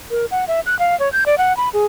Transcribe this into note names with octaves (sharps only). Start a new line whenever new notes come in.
A#4
F#5
E5
F#6
F5
C#5
G6
D5
F#5
B5
G#4